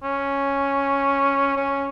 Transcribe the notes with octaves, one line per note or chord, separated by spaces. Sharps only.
C#4
C#4